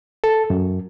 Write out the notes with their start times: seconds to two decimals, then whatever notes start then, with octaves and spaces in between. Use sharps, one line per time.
0.24 A4
0.50 F#2